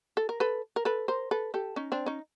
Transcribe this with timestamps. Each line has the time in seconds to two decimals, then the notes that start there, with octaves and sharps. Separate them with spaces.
0.17 A4
0.29 A#4
0.40 A4 B4
0.76 A#4
0.85 A4 B4
1.08 A#4 C5
1.31 A4 B4
1.54 G4 A4
1.76 C#4 D#4
1.92 C4 D4
2.06 C#4 D#4